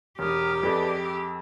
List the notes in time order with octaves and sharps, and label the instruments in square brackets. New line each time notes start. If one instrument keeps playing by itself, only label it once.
[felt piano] E1 [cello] G4 [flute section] A#5 D#6 F6
[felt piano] F2 G#3 [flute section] A4 B4 D5
[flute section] E6